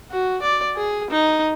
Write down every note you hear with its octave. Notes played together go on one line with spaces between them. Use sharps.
F#4
D5
G#4
D#4